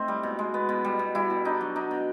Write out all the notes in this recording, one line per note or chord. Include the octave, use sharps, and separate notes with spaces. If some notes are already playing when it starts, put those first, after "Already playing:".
Already playing: A3 C4 D#4
G3
B2
G#3
B3
B2
G3
B2
G3 E4
B2
D4 D#4
F#3
D4 D#4
B2